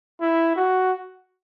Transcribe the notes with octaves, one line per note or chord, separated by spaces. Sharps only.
E4
F#4